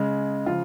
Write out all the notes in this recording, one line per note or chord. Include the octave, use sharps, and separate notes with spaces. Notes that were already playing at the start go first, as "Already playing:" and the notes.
Already playing: C#3 G#3
C#3 F3 F4